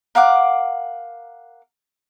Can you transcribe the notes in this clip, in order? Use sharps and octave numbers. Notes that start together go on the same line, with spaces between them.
A#4 F5 F#5 D6